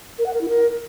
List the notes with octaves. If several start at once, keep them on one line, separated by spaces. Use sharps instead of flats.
A#4
F#5
A#4
E4
A#4